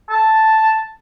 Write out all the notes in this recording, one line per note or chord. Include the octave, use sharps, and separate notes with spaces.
A5